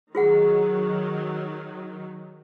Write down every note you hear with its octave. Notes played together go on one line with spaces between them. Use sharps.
D#3 F#3 F4 G#4 F#5